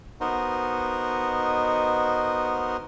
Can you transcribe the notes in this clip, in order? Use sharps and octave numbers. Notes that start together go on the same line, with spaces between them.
B3 D#4 F#4 A#4 C5 D#5